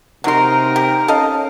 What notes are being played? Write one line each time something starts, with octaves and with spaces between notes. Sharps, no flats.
C3 F#3 D#4 A#4 C6
G4
C#4 A4 D#5 F5